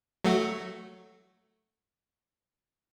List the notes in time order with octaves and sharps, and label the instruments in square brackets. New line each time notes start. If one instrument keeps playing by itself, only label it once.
[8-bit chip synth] F#3 A3 F#4